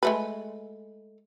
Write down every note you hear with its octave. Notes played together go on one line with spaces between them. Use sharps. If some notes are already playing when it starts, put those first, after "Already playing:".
G#3 A3 B4